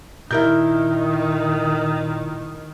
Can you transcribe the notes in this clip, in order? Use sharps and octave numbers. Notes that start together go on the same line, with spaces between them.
A#2 D#3 E4 A#4 G6